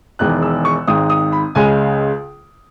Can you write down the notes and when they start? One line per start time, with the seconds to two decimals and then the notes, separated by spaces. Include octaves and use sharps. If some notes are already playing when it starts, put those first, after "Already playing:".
0.19 E1 E2 D#3 F#6
0.42 E6
0.65 C#6
0.87 G#1 G#2 D#3 D#6
1.10 D#6
1.32 B5
1.55 C#2 C#3 G#3 G#5